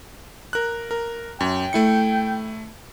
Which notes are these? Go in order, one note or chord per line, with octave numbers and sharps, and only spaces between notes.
A#4 F#6
A#4
F#2 G5
A3 E4 C#7